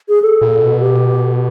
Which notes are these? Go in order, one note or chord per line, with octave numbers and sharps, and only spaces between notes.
G#4
A4
A#2
B2
G4